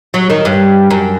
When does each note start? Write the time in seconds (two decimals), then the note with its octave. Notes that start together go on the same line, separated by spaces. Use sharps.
0.14 F#3
0.30 D#3
0.45 G2
0.90 F#2